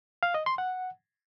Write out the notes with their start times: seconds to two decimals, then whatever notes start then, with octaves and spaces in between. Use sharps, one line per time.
0.23 F5
0.34 D#5
0.46 C6
0.58 F#5